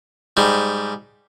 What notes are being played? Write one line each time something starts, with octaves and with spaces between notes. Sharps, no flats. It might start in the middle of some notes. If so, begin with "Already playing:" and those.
G#2 G3